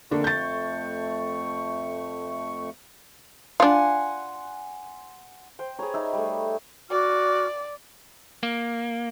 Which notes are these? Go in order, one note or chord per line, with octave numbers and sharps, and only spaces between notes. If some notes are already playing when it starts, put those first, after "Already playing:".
F2 D3 A3 A#3 D4 C#6
G6 A6
D4 F4 F#5 G#5 C6
C5 G5
G4 G#4 B4 C#5 A#5
D#4 D5 E5
G3 A3
F#4 D5 D6 F6
A#3